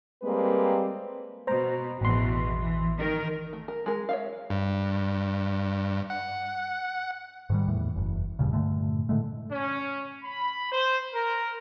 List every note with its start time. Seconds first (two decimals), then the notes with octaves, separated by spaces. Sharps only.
0.23 G3 G#3 A#3 C4 B4
1.47 B2 C5 A#5
2.01 A1 E2 B2 E3 C6
2.58 E3
2.97 D#3 A#4
3.53 A3
3.68 A#4
3.86 G#3 G#4 A#4
4.09 C#5 E5 F5
4.50 G2
6.10 F#5
7.50 G#2 D#3 G3
7.68 E2 A2
7.96 F#1 E2
8.39 E2 G2 A#2 C#3
8.53 G2 A#2 D3 A3
9.09 A2 D3 G#3 A3
9.50 C#4
10.23 B5
10.70 C5
11.13 A#4